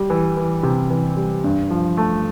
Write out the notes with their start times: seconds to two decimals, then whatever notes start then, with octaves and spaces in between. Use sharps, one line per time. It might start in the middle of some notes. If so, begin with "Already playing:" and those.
Already playing: G3
0.10 E3
0.37 E3
0.63 C3
0.90 E3
1.17 G3
1.44 G2
1.71 F3
1.97 A3